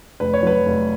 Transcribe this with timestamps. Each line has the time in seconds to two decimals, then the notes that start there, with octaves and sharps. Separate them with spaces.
0.20 F1 B4
0.34 C#5
0.43 F#3 B4
0.66 F1